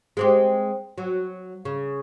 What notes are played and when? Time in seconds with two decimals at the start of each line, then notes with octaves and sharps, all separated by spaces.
0.17 G#3 C4 G4
0.98 F#3
1.65 C#3